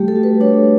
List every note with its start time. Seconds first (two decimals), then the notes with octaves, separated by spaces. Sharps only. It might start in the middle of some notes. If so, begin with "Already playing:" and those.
Already playing: G3 A3 G4
0.08 A4
0.16 F#4
0.23 B4
0.40 D4 C#5